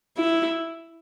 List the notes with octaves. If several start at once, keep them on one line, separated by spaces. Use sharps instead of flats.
E4